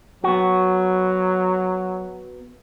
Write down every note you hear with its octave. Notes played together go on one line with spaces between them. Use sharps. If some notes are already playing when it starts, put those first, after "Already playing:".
F#3 B3 F#4